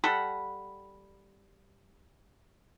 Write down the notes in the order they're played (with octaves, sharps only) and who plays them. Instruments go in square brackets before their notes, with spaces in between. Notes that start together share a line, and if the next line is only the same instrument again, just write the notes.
[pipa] G3 A4 F#5 B5